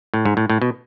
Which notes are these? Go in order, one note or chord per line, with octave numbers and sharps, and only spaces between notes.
A2
G#2
A2
A2
B2